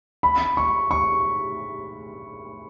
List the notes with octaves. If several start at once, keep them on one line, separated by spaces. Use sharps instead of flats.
B5
C#6
C#6